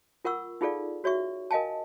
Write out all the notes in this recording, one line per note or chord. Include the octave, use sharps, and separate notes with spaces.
F4 A#4 F#5 C#6 E6
D#4 F4 G#4 A4 D5 F5
F#4 C#5 E5 C#6
A#4 D#5 F5 G#5 A5